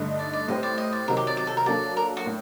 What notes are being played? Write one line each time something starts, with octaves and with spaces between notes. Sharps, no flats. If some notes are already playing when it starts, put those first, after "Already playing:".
Already playing: G2 D3 A3 D#4
D5
D5
A2 G3 C4 G4 C5 D#5
D5
D#5
D5
C3 D#3 F#3 A#4
G4
D5
D5
A4
A#4
F#3 A#3 D4 A4 D5
A#4
F#4
A2